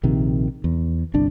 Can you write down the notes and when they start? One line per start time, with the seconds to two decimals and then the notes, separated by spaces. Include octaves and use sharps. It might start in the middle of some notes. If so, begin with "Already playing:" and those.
0.03 A#1 C3 D#3
0.64 E2
1.14 G1 C2 D4